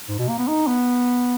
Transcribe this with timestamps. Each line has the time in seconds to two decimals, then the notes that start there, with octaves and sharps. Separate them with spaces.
0.09 G#2
0.19 B2
0.28 A#3
0.38 B3
0.48 D#4
0.67 B3